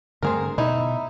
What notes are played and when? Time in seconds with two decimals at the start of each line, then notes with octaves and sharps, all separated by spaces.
0.23 G2 D3 A3 C4 G#4 A#4
0.58 B2 D#4 E4